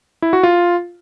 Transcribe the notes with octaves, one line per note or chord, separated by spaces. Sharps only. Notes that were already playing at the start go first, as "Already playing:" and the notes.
E4
F#4
F4